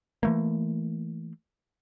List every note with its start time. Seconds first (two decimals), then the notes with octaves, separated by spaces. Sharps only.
0.23 E3 A3 A#3